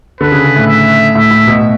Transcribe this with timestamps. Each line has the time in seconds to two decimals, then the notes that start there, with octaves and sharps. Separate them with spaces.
0.20 D3 B4
0.32 C#3
0.44 C#3
0.56 A2
0.67 E5
1.15 A2 E5
1.31 A2
1.47 B2